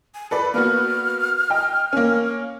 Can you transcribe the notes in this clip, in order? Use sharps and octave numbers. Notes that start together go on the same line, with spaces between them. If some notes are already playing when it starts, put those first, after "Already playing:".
G#5
A4 B4 D5 B5
A#3 B3 F#4 F6
D#5 G5
A#3 C#4